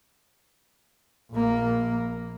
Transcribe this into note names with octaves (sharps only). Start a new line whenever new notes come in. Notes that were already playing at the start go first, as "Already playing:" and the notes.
A#1 A#3